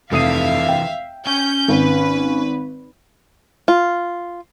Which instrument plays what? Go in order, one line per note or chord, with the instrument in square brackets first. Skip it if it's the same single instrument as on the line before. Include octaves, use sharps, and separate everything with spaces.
[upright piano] F1 D#6 D#7 [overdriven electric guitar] C3 E3 [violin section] E5 F5
[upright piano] G5
[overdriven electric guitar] C#4 G#5 [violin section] G6
[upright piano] G#1 [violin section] B4
[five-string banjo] F4